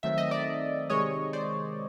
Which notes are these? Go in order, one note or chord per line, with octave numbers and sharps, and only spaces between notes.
D#3 F#3 A3 C4 E5
D#5
D5 E5
C3 D#3 G#3 C#5 D#5
C5 D5